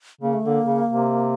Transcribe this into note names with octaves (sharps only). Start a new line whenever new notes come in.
C#3 A#3
A3
D3 A#3
C#3
C3